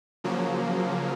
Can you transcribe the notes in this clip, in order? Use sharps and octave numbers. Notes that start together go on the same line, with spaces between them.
C#3 F3 F#3 A#3